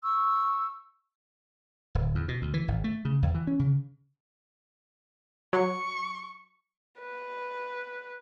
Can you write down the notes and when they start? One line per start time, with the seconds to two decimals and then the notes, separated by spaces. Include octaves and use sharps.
0.03 C#6 E6
1.95 D1
2.15 E2
2.28 B2
2.42 D2
2.54 E3
2.68 G#1
2.84 A3
3.05 C#3
3.22 E2
3.34 E3
3.47 C#4
3.59 C#3
5.53 F#3 C#6
7.01 B4